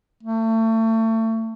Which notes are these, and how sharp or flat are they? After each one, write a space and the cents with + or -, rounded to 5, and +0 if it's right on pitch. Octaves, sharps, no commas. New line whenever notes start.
A3 +30